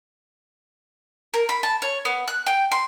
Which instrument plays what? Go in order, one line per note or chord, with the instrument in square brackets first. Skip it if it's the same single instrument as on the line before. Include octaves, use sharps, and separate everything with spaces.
[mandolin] A#4
B5
A5
C#5
B3
F#6
G5
C6